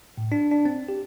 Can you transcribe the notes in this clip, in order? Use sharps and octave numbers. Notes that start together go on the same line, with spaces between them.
A2
D4
D4
C4
G4